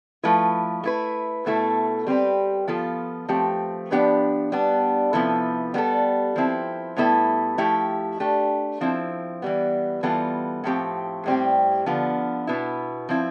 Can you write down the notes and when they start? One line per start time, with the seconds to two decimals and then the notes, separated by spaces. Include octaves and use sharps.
0.23 F3 A3 E4 B4
0.84 A3 E4 B4
1.46 B2 A3 E4 A4
2.07 G3 C4 G4 B4
2.68 F3 B3 F4 A4
3.28 F3 A3 C4 G4
3.91 F3 B3 D4 G4 B4
4.52 G3 B3 D4
5.13 C3 F3 B3 E4 A4
5.74 G3 B3 D4 A4
6.36 F3 C4 E4
6.96 A2 G3 B3 E4 A4
7.58 F3 A3 E4 G4
8.20 A3 D4 G4
8.81 F3 C4 E4
9.42 E3 G3 B3
10.03 E3 G3 B3 F4 A4
10.64 A2 F3 A3 C4 G4
11.26 A2 G3 C4 G4
11.86 D3 F3 B3 F4
12.47 B2 B3 E4
13.09 F3 C4 E4